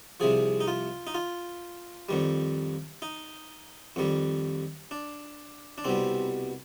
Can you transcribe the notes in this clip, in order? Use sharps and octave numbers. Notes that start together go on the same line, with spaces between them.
C2 C3 F3 G#4
D#4
F4
D#4
F4
F2 D#3 G3
D#4
F2 D#3 G3
D4
D4
C2 B2 G3 C4